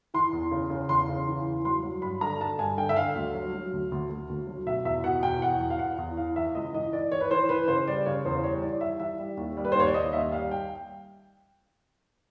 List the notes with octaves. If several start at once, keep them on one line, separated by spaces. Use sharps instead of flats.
E3 C6
E2
C#3
C#3
E2 C6
C#3
E3
E2
F#3 C6
F#3
G2 B5
D3 A#5
D3 A5
G2 G#5
D3 G5
E5
D3 F5
D2
F#3
F#3
D2
D2
D2
D2
F#3
B2 E5
E2 E5
B2 F#5
E2 G5
E2 F#5
E2
F5
E2 F#5
E2
E3 F5
E3 E5
C#2 D#5
E3 D#5
E3 D5
E3 C#5
B4
E3 C5
E3 B4
C#3 C5
G3 D5
C#3 C#5
E2 C5
G3 C#5
E3 D5
G3 E5
E3 E5
G3
D#2
G3
B4
C5
D#2 C#5
D5
D#2 D#5
D#2 E5
G3 F5
G5